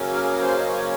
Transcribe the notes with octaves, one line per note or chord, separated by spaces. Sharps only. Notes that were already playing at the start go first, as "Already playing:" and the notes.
Already playing: C#3 F#3 A#3 C#4
A#4
G#4
A#4
C5
D#5
C#5